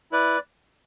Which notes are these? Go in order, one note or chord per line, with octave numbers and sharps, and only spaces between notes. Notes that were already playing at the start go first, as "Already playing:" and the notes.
E4 B4 D5